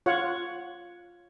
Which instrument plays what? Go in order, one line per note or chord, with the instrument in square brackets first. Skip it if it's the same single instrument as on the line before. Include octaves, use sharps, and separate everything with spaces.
[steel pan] F4 C#5 F#5